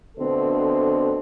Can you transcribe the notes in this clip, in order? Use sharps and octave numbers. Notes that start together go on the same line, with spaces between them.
B2 D3 A3 C4 A4